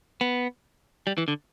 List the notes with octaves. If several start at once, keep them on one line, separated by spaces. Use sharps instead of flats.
B3
G3
E3
D3